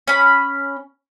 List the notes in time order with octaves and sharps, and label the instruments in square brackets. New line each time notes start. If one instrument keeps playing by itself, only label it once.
[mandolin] C#4 B5